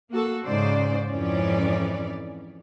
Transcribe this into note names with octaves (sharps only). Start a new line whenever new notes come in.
A#3 F#4 A4
G#2 C#3 C5 D5
F2 G#2 E3 C#4 D5